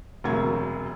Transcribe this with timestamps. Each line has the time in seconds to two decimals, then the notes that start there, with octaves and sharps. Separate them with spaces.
0.24 E1 D2 C3 F#3 A#3 G#6